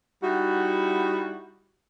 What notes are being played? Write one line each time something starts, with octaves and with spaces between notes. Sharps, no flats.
G3 D#4 E4 F#4